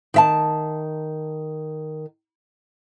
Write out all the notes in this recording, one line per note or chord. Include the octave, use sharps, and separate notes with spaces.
D#3 E5 A5